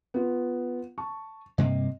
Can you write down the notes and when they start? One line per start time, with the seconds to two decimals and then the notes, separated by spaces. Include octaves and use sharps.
0.14 B3 F4
0.98 A5 C#6
1.58 G2 C3 A#3 D#5